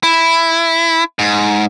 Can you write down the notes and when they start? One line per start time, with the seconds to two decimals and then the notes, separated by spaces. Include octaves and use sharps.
0.03 E4
1.19 G#2